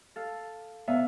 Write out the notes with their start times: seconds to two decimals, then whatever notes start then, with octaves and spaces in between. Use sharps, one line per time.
0.16 A4 F5
0.88 B3 E5 F5